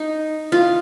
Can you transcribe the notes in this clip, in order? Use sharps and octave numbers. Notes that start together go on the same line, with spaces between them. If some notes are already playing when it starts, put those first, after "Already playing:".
Already playing: D#4
F4